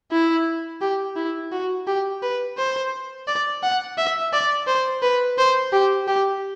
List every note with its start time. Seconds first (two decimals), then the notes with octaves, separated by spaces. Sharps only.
0.12 E4
0.81 G4
1.16 E4
1.52 F#4
1.87 G4
2.22 B4
2.58 C5
3.27 D5
3.62 F#5
3.98 E5
4.33 D5
4.67 C5
5.02 B4
5.38 C5
5.72 G4
6.08 G4